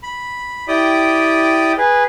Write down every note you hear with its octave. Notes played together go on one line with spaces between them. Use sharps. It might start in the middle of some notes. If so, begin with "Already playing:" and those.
B5
E4 G4 D5 G5 D#6
G#4 B4